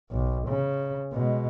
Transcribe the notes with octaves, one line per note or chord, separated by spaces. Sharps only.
B1
C#3
B2 G#3